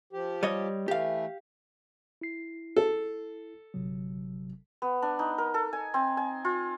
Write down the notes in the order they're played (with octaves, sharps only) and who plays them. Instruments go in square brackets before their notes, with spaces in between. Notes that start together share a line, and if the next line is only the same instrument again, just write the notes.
[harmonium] F3 G4
[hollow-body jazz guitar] G3 C#5 D#5
[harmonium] E3 A3 [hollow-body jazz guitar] G4 F5
[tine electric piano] E4 C7
[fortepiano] A4
[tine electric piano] G1 C3 F#3
[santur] B3
D4
D#4
A#4
A4
G#5
C4
G#5
F4